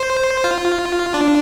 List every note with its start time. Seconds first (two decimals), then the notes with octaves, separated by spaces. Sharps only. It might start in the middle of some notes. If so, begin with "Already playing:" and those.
Already playing: C5
0.44 F4
1.14 D4